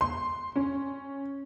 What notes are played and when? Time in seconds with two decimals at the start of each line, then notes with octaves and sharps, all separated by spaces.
0.01 C6
0.56 C#4